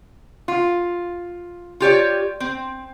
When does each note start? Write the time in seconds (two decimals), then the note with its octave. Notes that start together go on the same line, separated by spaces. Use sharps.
0.48 F4
1.80 F4 G4 C#5 D5
2.40 C4